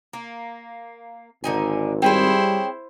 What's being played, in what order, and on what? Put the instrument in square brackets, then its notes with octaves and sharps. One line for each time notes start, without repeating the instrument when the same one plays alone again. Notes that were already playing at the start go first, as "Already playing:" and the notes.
[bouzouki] A#3
[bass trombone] G#1 [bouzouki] D3 D#4 G#5
[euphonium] G3 [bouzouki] C4 G#4 C#5 [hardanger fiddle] E4 C5